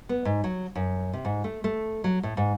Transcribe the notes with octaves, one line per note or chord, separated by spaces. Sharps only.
B3
G#2
F#3
F#2
C3
G#2
A3
A3
F#3
A2
G#2